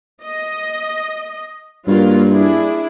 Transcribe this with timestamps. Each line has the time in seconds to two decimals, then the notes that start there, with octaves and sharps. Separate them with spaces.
0.25 D#5
1.87 G2 F#3 A#3 F4
2.31 D4 E4 G#4